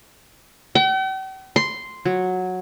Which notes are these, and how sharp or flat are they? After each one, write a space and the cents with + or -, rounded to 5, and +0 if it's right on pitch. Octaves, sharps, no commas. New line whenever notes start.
G5 -45
C6 -5
F#3 -10